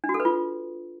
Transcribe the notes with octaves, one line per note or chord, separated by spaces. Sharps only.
D4
F#4
A4
B4
F4